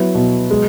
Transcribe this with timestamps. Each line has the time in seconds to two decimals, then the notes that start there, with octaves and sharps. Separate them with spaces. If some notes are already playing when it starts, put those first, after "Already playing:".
Already playing: F#3 B3 E4
0.15 B2
0.50 G#3